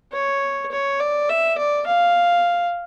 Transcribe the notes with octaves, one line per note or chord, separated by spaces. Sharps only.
C#5
C#5
D5
E5
D5
F5